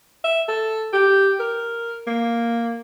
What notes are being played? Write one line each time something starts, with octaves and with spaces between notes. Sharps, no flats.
E5
A4
G4
A#4
A#3